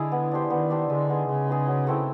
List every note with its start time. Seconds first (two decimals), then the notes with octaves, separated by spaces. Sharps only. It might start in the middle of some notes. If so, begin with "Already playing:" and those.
Already playing: D3 G#3 E4 G#4
0.12 B3
0.31 D4 G4 C5
0.50 D#3 B3
0.70 D4 G4 C5
0.90 D3 G#3
1.09 B3 D#4 G#4
1.29 C#3 G#3
1.48 B3 D#4 G#4
1.67 F#3
1.87 A3 C4 E4